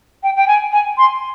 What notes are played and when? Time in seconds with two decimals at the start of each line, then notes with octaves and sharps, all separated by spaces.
0.23 G5
0.36 G5
0.47 G#5
0.72 G#5
0.97 C6